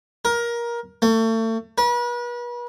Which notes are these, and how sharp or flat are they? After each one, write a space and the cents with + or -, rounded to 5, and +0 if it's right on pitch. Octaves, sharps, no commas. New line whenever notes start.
A#4 +20
A3 +35
B4 -40